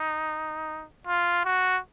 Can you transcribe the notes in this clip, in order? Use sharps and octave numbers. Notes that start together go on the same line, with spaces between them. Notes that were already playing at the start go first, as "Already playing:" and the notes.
Already playing: D#4
F4
F#4